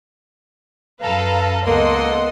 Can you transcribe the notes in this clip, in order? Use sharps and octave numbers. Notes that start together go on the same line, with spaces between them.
F#2 A4 B4 F5 A#5
C#2 A#3 B3 A4 D#5 F#5 C6